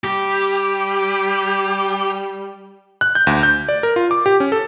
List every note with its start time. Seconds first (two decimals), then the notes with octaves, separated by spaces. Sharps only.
0.04 G3 G4
3.01 F#6
3.15 G6
3.27 D2
3.43 G6
3.69 D5
3.83 A#4
3.96 F4
4.11 D6
4.26 G4
4.40 C#4
4.52 A4